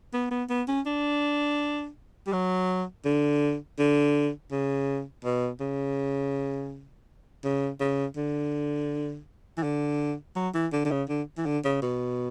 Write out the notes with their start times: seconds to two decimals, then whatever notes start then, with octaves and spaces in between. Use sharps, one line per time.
0.14 B3
0.31 B3
0.50 B3
0.68 C#4
0.86 D4
2.27 G3
2.33 F#3
3.05 D3
3.79 D3
4.52 C#3
5.25 B2
5.61 C#3
7.44 C#3
7.80 C#3
8.17 D3
9.58 E3
9.63 D3
10.36 F#3
10.54 E3
10.73 D3
10.85 D3
10.91 C#3
11.09 D3
11.38 E3
11.46 D3
11.64 C#3
11.82 B2